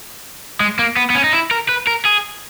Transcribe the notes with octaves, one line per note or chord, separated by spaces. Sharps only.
G#3
A#3
B3
B3
C#4
D#4
E4
A#4
B4
A#4
G#4